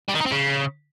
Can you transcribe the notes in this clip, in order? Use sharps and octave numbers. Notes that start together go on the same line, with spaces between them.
G3
D#3
D#4
C4
C#3